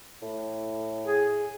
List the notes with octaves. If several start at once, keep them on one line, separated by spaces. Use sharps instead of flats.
A2
G#4